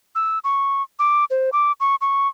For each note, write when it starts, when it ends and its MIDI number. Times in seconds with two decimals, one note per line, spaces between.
0.15 0.39 88
0.44 0.83 85
0.99 1.25 86
1.30 1.50 72
1.53 1.72 86
1.80 1.95 85
2.01 2.28 85